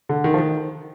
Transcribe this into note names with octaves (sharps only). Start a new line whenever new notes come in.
D3
D#3
F3
D#3